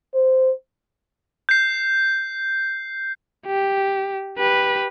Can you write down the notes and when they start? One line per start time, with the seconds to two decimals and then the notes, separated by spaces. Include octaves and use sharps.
0.14 C5
1.49 G6 C7
3.47 G4
4.38 G4 B4